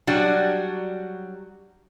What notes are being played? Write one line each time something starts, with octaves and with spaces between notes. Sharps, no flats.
F#3 G3 D4 F#4